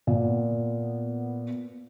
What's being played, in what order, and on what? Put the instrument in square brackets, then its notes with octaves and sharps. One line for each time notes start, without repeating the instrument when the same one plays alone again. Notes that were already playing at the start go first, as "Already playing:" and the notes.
[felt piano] A#2 [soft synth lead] B3